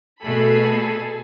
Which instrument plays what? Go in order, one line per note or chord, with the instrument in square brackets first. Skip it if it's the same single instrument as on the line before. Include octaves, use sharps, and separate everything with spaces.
[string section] B2 A3 B5 [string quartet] G#4 A4